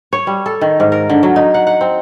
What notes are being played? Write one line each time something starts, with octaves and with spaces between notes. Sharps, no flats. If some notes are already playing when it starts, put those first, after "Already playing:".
C#5
G3
A4
D#3
G#2
A#4
D3
F#3
D#4
F#5
F#5
C4